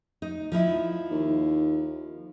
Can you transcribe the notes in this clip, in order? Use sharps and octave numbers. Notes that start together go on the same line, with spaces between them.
D#4
F3 D#4 E4
D#2